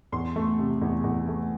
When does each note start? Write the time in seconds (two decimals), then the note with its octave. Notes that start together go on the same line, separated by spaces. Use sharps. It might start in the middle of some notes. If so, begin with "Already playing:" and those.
0.12 E2 C6
0.36 A3
0.59 C3
0.81 E2
1.04 E2
1.28 A3